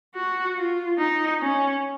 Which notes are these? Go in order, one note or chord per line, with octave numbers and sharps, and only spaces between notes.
F#4
F4
D#4
C#4